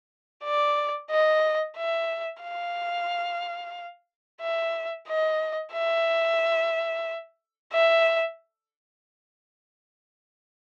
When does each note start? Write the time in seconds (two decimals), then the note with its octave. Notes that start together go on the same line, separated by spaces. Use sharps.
0.44 D5
1.10 D#5
1.77 E5
2.43 F5
4.41 E5
5.08 D#5
5.74 E5
7.73 E5